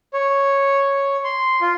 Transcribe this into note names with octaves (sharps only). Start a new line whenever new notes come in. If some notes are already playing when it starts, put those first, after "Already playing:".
C#5
C6
F4